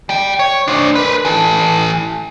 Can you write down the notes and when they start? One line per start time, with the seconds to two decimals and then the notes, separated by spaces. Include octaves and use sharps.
0.09 G3 G5
0.39 C#5
0.68 D4 C5
0.95 A#4 B4
1.25 E3 A4